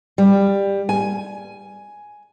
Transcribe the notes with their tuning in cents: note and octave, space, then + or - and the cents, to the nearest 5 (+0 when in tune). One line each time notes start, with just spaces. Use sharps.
G3 +15
G#5 +5